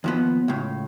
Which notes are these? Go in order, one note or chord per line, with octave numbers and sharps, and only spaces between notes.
D#2 F3 B3
C#2 A2